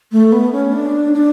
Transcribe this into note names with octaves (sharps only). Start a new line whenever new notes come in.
A3
B3
C#4
D4
D4